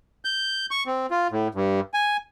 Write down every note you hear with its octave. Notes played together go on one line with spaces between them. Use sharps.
G6
C#6
C4
F4
A2
G2
G#5